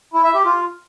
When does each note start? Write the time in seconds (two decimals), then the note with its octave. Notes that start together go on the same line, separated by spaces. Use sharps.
0.14 E4
0.24 E5
0.35 G4
0.45 F4